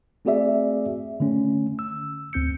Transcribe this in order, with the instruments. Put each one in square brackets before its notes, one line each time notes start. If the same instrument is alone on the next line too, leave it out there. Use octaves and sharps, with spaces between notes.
[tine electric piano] A3 C4 F#4 G#4 D5 E5
D3 A3 C#4
E6
D2 C4 G6 C#7